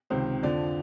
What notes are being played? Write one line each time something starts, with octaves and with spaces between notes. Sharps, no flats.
C#2 C3 D#3 C5
F2 D3 F3 D5